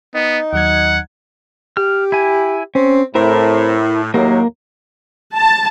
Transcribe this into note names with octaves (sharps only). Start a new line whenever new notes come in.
B3 D#4
D#2 F#3 F#5 G#6
G4 F6
E4 G#5
C4 C#4
A2 C4 E4 A#4
D#2 A2 F#3 A#3 A#4
A5